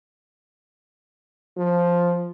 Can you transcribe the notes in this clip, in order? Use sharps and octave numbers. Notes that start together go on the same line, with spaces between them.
F3